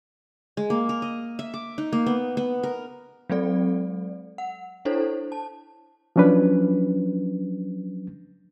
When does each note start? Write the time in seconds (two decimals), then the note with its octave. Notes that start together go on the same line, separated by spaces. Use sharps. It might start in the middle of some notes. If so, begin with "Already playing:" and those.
0.57 G#3
0.70 A#3
0.89 A#4
1.02 D#5
1.39 E5
1.54 D6
1.78 D#4
1.93 A#3
2.06 B3
2.37 B3
2.63 A#4
3.30 F#3 G#3 C4 A4 D5
4.38 F#5
4.85 D4 E4 A4 C5 C#5
5.32 A5
6.16 F3 F#3 C#4 D4 B4